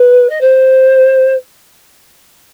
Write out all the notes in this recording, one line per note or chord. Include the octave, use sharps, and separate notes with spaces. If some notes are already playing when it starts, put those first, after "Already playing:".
Already playing: B4
D#5
C5